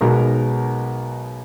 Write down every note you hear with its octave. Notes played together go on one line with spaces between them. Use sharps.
B1 B2 G#3 B3 D#4 A#4